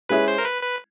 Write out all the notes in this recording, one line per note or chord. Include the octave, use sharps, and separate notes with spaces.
G#3 C#4 E4 G#4 B4
C5
A#4
B4
B4